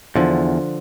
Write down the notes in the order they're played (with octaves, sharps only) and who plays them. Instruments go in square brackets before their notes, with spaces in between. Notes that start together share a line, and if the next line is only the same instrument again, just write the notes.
[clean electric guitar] E2 [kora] D3 F3